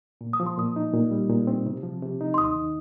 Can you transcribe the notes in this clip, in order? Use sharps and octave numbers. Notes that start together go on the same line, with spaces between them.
A#2
D#6
F3
C6
A#2 D#6
D#4
A#2
G3
A#2
C4
C3
F3
C3
D#4
C6
D#2 D#6
D#3